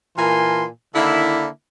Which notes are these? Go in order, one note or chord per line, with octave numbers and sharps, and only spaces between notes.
A#2 E3 A#4 G#5 A5 C6
D3 D#3 A#3 E4